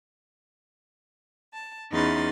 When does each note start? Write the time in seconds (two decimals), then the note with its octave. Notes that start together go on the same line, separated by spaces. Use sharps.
1.52 A5
1.91 E2 C#4 D#4 B4 C6 A6